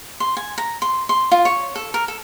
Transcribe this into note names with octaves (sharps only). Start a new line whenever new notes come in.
C6
G#5
A#5
C6
C6
F4
C#5
A4
A#4
A4